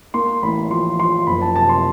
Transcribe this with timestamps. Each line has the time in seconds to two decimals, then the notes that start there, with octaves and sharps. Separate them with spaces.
0.14 A#3 C6
0.42 A1 B5
0.71 F3 C6
0.99 F3 C6
1.27 F#1 B5
1.42 A5
1.56 C3 A5
1.69 C6